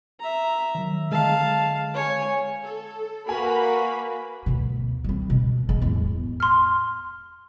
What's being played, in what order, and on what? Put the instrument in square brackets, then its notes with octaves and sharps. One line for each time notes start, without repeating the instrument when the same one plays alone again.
[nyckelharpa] E5 A#5
[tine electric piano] D#3 F#3
[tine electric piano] D3 G#3 [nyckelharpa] F5 A5
[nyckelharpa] C#5 G#5
[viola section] A4
[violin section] A#3 B4 [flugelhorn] F#4 [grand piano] G#5 [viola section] B5
[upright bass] D2 B2
G3 C4
B2
G#3
E2 A2
[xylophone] C6 F6